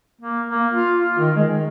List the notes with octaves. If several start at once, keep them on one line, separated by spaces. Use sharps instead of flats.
A#3
A#3
F4
F4
D#3
G#3
D#3